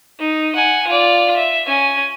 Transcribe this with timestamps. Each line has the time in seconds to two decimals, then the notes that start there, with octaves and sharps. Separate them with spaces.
0.19 D#4
0.55 F#5 G#5
0.87 F4 D5
1.36 E5
1.67 C#4 G#5